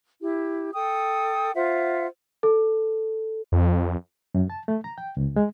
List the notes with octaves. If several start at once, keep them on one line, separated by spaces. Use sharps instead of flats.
E4 G4
A4 G5 D#6
F4 C5 E5 F#5
A4
F2
F#2
A5
A3
A#5
G5
C#2
G#3